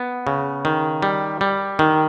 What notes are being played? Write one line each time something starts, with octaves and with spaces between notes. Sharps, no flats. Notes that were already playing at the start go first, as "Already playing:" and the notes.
Already playing: B3
C#3
D#3
G3
G3
D#3